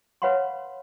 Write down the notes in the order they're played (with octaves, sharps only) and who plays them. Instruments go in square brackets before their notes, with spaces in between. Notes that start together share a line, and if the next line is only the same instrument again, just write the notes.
[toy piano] B4 C#5 F5 F#5 B5 C6